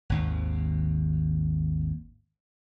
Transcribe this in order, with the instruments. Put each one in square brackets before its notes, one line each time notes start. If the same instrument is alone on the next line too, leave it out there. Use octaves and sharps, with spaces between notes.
[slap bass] G#1 D#2